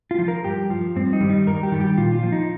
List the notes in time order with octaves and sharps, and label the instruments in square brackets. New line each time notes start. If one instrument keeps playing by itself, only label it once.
[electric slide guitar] F4
F3
A#4
G2 G4
F3
G2 C4
D#4
D#3 G3
D#4
G2 A#4
G4
D#3 G3
G4
A#2 F4
F4
F3
D#4